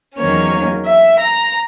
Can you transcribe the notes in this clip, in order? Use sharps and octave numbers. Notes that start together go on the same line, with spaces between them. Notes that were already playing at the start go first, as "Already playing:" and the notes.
E2 D#3 F#3 A#3 C#4 C#5
E5
A#5